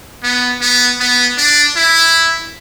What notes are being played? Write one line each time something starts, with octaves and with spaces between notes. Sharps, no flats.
B3
B3
B3
D4
E4